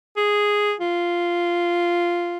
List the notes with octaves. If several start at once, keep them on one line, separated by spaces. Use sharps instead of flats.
G#4
F4